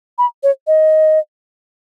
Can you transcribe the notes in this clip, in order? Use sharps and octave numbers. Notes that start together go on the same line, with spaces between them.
B5
C#5
D#5